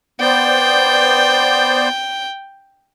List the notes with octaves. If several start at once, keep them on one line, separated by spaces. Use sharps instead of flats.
B3 C5 D5 G5